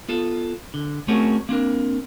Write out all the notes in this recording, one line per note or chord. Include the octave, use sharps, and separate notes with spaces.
B3 F4 A4
D3
A3 C4 C#4 F#4 G#4 A#4
A#3 C4 D4 A#4